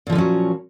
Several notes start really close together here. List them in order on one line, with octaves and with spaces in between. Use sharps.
A#2 F3 D3 C#4 F#3